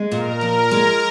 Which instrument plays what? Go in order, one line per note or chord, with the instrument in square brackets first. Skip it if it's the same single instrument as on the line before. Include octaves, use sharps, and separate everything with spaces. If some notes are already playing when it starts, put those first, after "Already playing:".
Already playing: [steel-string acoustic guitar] G#3
[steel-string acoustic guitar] A#2 [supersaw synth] A#4
[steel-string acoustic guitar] F3
G#3